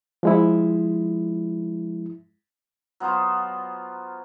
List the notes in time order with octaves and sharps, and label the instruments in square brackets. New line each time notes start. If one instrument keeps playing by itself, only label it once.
[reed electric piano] F3 G#3 E4
[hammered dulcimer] F#3 B3 F4 C5